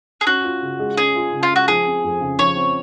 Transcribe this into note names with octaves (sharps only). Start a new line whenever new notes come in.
G#4
C#4 F#4
F4
C#3
G#3
C#4 G#4
F4
C#3
F4
G#3
F#4
F3 G#4
C4
F2
C#3
F3 C#5
C4